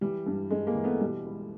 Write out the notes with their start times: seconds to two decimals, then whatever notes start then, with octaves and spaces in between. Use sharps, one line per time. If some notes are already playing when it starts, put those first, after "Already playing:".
0.01 E3 G3
0.26 G2
0.51 G2 G#3
0.67 G#3 A#3
0.75 E3
0.84 A3 B3
1.00 B2 G3
1.25 C#2